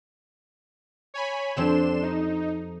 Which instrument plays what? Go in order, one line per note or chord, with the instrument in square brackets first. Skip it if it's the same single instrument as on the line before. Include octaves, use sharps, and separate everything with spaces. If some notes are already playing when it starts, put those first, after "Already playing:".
[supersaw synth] C#5 G#5 B5
[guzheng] F2 C4 G4 [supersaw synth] D4 C6 E7
[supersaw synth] D#4